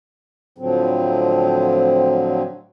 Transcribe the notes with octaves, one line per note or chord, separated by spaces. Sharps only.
A2 D3 F3 F#3 C4